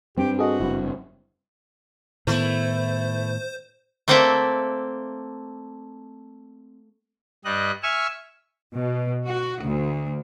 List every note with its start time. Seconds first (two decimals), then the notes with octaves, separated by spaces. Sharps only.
0.17 G2 C4 G4
0.39 F#4 G#4 A4 D#5
0.60 F#1 G2 E4
2.27 A2 D#3 A3 B3 E4 C5
4.08 A3 A#3 C4 A4 D5 E5
7.45 G2 G3 D#5 F#6
7.83 E5 G#5 C#6 E6 F6
8.75 B2
9.27 F#4
9.61 D2